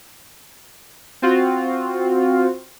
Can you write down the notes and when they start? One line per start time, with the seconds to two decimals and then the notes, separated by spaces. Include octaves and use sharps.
1.22 C4 F4 F#4